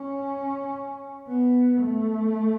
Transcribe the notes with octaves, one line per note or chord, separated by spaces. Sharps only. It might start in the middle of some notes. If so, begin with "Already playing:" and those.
Already playing: C#4
B3
A3